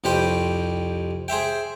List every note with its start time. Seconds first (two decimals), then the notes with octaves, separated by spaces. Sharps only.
0.04 C2 F2 G4 B4 C5 G5
1.28 G#4 C5 E5 G5